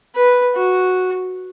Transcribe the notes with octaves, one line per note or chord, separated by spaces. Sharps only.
B4
F#4